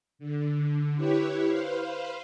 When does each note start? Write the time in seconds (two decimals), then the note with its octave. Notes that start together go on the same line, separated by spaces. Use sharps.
0.19 D3
0.96 E4 G4 B4 C#5
1.46 B4 C5 F5